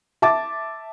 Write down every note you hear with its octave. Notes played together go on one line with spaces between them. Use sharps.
E5 A5 D6 A6